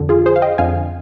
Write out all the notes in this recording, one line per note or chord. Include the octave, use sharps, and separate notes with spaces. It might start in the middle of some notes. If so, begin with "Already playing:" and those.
Already playing: F2 D3
F4 G#4
G#4 C5
F5
D#5 G5
F2 D3 F5 G#5